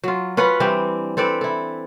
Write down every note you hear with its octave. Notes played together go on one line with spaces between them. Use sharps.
F#3 F4
C#4 F4 B4 F#5
E3 G3 C4 D4
C4 A4 B4 D5
E4 A4